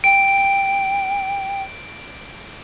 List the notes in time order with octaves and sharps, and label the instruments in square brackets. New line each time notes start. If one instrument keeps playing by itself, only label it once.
[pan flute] G5 [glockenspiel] D7